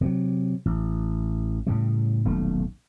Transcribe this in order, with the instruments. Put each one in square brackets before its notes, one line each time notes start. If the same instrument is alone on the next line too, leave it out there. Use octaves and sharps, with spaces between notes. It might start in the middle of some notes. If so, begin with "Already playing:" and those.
[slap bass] C3 F#3
A1
A2 C#3 G3
D#1 B1 A3